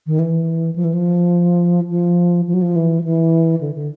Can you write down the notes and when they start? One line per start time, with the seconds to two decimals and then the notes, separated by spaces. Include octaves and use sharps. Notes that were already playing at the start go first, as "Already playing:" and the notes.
0.06 D#3
0.19 E3
0.76 F3
0.84 E3
0.93 F3
1.90 F3
2.47 F3
2.54 F#3
2.62 F3
2.76 E3
2.99 F3
3.04 E3
3.61 D3
3.75 D3